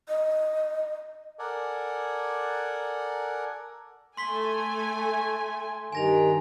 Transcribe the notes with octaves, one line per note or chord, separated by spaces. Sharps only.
D#5
A4 A#4 D5 F#5 G#5
A3 G#5 C6 B6 G7
G2 D#3 G#5 A#6 F7